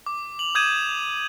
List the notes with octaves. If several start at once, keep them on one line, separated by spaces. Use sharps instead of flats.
D6
F7 F#7
D#6 G6 G#6 D#7 E7